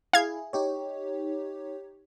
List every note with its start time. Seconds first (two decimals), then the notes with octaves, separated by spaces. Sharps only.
0.13 E4 G#4 F5 G#6
0.53 D#4 G4 C#5